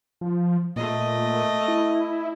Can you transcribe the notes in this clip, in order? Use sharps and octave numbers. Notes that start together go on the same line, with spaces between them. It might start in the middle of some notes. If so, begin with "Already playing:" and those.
F3
A#2 A3 D#5
E4